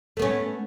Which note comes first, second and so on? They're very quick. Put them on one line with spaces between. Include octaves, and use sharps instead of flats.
A3 B3 C#4